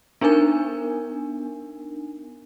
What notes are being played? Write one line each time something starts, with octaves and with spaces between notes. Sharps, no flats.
B3 D4 D#4 A#4 G#5